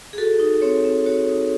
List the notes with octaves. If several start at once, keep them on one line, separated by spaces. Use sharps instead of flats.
G#4
F#4 A4
D#4
C4 C#5
C4
F#4 C#5
D#4